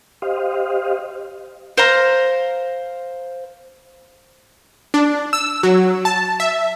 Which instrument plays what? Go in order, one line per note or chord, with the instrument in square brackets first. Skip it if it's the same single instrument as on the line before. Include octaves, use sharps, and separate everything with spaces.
[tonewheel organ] G4 C5 D#5 F5
[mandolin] C5 F5 A#5
[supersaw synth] D4
E6
F#3
A5
E5